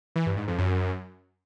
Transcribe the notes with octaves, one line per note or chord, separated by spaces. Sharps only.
E3
G2
G#2
F2
F#2